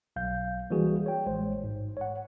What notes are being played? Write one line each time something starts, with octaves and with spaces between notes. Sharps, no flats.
B1 F5 G6
E3 G3 A#3 F#4 G#4
C#5 G5
A1 G#3 C5
G#2
C#5 F#5